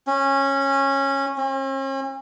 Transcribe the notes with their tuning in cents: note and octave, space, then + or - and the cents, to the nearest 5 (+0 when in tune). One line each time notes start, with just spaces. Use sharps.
C#4 -15
C#4 -45